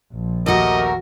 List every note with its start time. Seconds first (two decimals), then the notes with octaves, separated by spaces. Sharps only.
0.13 A#1 F3
0.46 D#2 A3 F#4 G4 A#4 D#5